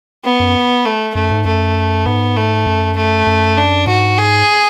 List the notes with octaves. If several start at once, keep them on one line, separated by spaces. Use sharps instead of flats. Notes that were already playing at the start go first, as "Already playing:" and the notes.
B3
F#2
A3
F#2 A3
G#2
F#2 A3
G#2 B3
A3
F#2
A3
F#2
D4
G#2 F#4
G#4